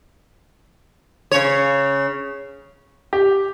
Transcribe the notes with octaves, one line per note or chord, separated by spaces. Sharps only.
C#3 C#5
G4